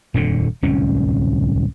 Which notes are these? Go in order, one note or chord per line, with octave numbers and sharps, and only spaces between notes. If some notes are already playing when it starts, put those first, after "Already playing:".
D#1 F2 A#2 D3
D1 C2 F2 C#4